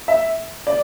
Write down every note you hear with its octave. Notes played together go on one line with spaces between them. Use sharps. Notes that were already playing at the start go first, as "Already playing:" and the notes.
E5
D5